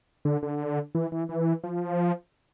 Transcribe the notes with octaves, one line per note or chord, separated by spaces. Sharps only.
D3
D3
E3
E3
E3
F3